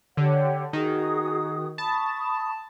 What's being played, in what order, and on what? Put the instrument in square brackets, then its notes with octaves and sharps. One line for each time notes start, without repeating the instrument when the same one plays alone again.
[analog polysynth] D3 [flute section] G4 C#5 F#5
[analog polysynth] D#3 [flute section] F#4 G#4 D#6
[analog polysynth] A5 [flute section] B5 C#6 D#6